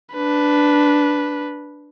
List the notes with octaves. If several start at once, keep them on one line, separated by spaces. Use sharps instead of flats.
D4 B4